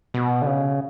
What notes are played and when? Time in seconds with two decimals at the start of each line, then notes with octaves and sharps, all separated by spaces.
0.14 B2
0.42 D3
0.46 C#3